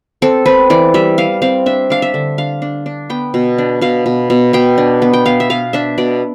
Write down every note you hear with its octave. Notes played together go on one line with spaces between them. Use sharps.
C4 A4
C4 B4
E3 D5
G3 E5
G3 F5
C4 F5
D4 E5
D4 F5
E5
D3
D4 F5
D4
D4
B3 G5
B2
D4
B2 F5
B2
B2
B2 G5
D4
B3
G5
B3 F5
E5
B3 F5
D4 E5
B2 D5